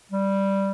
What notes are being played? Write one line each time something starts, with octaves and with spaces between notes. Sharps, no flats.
G3